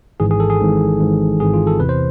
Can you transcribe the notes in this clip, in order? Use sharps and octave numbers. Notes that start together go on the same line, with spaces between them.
G#1 G#2 E3 G#4
G#4
A4
G#4
G#1 G#2 E3
G#1 G#2 E3
G#1 G#2 E3 G#4
F4
A4
E2 C3 E3 B4
C5